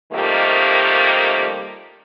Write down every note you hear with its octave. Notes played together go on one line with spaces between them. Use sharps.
C3 D#3 F3 G3 A3 A#3